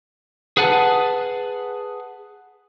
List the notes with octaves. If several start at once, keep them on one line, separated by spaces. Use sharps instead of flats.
G#4 B4 F#5 G#5 A5